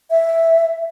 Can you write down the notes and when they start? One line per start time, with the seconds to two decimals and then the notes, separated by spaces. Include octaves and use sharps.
0.10 E5